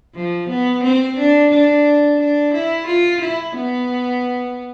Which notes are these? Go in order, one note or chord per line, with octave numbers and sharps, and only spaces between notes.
F3
B3
C4
D4
D4
D4
E4
F4
E4
B3